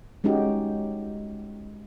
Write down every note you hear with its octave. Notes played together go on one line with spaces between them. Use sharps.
G#3 C#4 D#4 F#4 G4